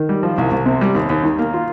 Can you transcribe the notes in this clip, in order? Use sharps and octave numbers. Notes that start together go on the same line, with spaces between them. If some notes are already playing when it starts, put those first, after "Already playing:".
Already playing: D#3
G3
F3
C2
C2
C3
G3
D#2
D#2
D#3
A#3
F4